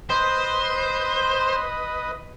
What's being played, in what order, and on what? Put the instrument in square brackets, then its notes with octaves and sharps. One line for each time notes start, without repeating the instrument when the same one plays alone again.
[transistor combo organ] B4 D#5 [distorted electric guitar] C5